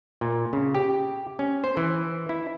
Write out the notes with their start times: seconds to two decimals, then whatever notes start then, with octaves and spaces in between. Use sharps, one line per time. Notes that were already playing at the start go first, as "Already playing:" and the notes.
0.21 A#2
0.53 C#3
0.75 G4
1.39 C#4
1.64 C5
1.77 E3
2.29 E4